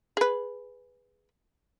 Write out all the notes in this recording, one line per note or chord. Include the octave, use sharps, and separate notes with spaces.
G#4 B4